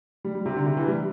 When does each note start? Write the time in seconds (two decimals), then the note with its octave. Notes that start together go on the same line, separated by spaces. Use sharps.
0.25 G3
0.35 G3
0.46 C3
0.56 D3
0.66 C3
0.77 E3
0.88 G3